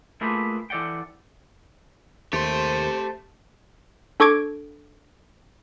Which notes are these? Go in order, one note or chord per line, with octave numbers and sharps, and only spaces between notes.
A3 A#3 E4 F4 G#4 B4
E3 A4 D5 F#5 G5
D#2 A3 G4 C5 C6
D4 A4 C#6 D6 G#6 D7